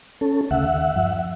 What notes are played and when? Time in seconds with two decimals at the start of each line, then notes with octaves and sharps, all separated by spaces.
0.21 C#4 A4
0.51 D2 C#3 E5 F#5
0.63 D#2
0.95 G2 F3